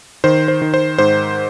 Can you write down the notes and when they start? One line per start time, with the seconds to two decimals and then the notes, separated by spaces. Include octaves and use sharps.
0.24 D#3 C5
0.48 C5
0.62 D#3
0.74 C5
0.98 G#2 C5